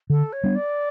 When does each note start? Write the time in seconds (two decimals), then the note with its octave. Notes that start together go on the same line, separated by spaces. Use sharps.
0.10 D3 A4
0.32 C#5
0.44 G3 B3 D4
0.55 D5